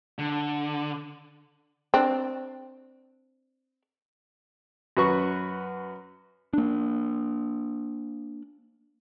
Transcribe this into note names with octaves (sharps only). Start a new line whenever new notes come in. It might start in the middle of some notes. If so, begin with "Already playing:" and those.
D3
C4 D4
F#2 F#4 B4 C#6
A#3 D4